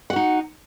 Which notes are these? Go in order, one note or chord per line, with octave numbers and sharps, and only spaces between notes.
D#4 F#4 F#5